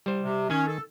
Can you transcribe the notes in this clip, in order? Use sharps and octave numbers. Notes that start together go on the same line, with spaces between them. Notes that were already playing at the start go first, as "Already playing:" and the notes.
G3 C5
C3
D#3 C#4 G#5
A4